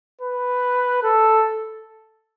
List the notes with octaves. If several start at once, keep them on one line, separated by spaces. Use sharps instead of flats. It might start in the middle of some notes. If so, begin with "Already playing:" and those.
B4
A4